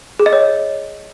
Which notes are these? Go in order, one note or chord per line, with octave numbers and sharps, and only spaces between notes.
G#4
D#5
C#5